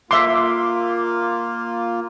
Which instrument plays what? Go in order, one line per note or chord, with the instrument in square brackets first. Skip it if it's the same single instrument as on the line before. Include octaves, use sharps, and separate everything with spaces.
[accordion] A#3 F4 [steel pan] E5 C6 [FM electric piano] D6